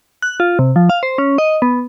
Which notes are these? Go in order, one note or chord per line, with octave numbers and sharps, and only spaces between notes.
F#6
F4
C3
F3
F5
C5
C#4
D#5
B3